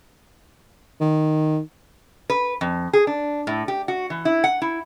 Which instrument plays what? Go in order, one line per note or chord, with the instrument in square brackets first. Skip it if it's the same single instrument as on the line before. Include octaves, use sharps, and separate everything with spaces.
[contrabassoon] D#3
[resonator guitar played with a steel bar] B4
F2
G#4
D4
A2
G4
F#4
E3
E4
F#5
E4